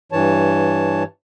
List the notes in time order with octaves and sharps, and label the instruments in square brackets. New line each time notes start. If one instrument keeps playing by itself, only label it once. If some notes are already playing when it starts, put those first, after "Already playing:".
[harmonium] G2 E3 C#5 A5